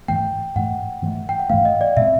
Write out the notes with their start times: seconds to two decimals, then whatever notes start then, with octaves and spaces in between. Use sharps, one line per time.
0.08 G#2 E3 A3 G5
0.56 G#2 E3 A3 F#5
1.02 G#2 E3 A3
1.29 G5
1.40 F#5
1.50 G#2 E3 A3 F5
1.65 D#5
1.81 D5
1.97 B2 G#3 C4 E5